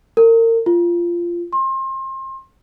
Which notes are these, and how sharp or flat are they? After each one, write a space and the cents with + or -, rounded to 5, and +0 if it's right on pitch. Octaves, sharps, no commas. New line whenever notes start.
A#4 -35
F4 -15
C6 +30